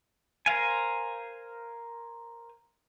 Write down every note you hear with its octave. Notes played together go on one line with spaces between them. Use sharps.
A#4 C5 F5 G#5